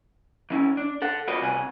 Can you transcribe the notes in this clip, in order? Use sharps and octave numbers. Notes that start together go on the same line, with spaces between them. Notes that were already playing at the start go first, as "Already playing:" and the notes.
D#3 C#4 E4
D4
A4 F#5
F4 F#4 B4 D5 D#5
C2 C3 F#5 G#5